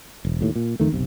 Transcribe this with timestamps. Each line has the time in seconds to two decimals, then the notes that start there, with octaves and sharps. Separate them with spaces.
0.25 E1
0.41 D#2 A2
0.55 A#2
0.80 F2 A#2 D#3 A3
0.92 F#1 B1 C3